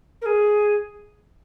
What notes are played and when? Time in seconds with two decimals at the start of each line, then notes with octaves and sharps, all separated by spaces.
0.22 A#4
0.26 G#4